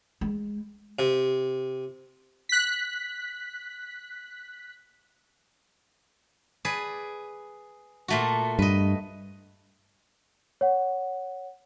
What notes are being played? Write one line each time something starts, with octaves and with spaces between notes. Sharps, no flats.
G#3
C3
F#6 B6
G#4 B4 D5
A#2 A3 F#4
G2 B4 D#5
C#5 F#5